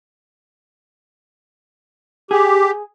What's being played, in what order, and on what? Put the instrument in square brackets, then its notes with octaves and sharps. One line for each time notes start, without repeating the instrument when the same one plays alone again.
[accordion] G4 [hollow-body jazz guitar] G#4